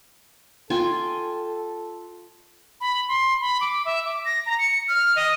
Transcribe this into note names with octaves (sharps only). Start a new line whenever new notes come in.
F4 A4 G5 G#5
B5
C6
B5
D6
E5
D6
A#6
A#5
C#7
F6
D#5